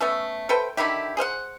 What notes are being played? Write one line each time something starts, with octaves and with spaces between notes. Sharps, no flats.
A3 B3 C#4 A4
A4 B4 C5 G5
D3 D#3 E4 G4
G#4 C5 F5 F#5